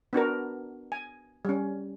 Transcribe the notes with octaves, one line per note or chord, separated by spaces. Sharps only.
B3 D4 F#4 A#4
G#5
G3 C#4